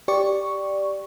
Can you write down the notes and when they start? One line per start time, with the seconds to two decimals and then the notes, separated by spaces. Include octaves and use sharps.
0.08 G4 D5 C#6